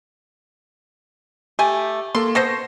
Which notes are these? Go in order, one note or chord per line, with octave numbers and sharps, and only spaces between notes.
A3 G4 G#5
A#3 A4 C6
B3 A4 C5 C#6 A#6 C7